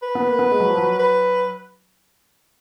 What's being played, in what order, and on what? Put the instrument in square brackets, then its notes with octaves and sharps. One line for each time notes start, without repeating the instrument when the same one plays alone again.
[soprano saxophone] B4
[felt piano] B3
A#3
B3
G#3
F#3
F3
F#3
[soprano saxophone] B4